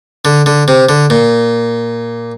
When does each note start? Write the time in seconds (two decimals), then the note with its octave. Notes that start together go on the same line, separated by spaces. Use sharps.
0.25 D3
0.46 D3
0.68 C3
0.89 D3
1.10 A#2